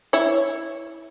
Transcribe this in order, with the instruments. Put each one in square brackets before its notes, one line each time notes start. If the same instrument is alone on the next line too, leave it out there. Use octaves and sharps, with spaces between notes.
[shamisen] E4 C#5